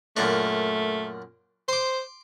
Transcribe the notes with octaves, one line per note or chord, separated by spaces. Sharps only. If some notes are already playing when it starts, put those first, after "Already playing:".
F#2 A#2 A3 D4
C5 C6 D6